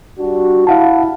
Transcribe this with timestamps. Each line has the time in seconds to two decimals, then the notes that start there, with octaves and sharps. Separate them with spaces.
0.19 G3 D4 F#4
0.67 E4 F5 F#5 A5